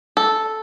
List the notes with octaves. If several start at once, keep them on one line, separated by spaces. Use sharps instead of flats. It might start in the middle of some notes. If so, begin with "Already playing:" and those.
A4